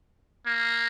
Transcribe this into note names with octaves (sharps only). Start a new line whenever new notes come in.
A#3